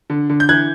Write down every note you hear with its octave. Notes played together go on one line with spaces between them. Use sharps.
D3
D3
G6
E3 F#6 G#6